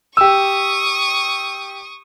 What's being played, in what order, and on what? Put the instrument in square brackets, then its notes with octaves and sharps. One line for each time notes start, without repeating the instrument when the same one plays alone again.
[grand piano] G4 E6 [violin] C#6 D#6